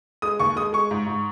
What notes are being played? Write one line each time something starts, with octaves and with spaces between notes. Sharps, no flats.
G#3 D#6
D#2 C#6
G#3 D#6
G#3 C#6
G#2
G#2